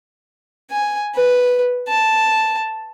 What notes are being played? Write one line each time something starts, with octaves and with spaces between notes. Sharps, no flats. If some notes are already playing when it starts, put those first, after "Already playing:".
G#5
B4
A5